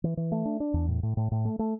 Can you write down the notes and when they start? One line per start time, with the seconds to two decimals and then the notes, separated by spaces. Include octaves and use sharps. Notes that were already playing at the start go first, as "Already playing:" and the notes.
0.04 E3
0.17 E3
0.32 A3
0.45 D4
0.60 D4
0.74 E2
0.88 A2
1.03 A2
1.17 A2
1.31 A2
1.45 A3
1.59 A3